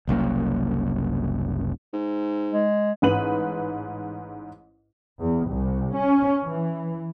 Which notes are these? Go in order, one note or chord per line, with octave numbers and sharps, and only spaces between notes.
F#1 C2 F#2 A#3
G#2
G#3
A1 G#2 B4 D#7 F#7
E2
C2
C#4
E3